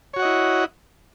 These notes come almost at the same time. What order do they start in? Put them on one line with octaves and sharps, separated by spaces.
C#5 F#4 F#5 D#5 E4